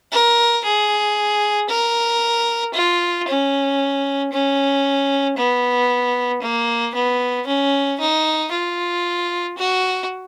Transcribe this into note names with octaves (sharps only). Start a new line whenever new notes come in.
A#4
G#4
A#4
F4
C#4
C#4
B3
A#3
B3
C#4
D#4
F4
F#4